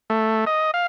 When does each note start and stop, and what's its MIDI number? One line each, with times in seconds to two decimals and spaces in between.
0.10 0.45 57
0.47 0.71 75
0.74 0.87 77